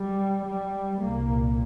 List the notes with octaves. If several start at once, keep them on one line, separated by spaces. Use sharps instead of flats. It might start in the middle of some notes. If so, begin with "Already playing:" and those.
Already playing: G3
G3
C2 A#2 A#3